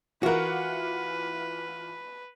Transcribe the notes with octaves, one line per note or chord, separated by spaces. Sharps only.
E3 F4 F#4 A#4 B4 F#5